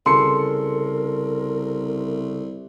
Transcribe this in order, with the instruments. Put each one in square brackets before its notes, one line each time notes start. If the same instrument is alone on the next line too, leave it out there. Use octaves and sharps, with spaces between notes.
[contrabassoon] C2 [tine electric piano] C#3 A4 [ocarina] A#4 [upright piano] C6 C#7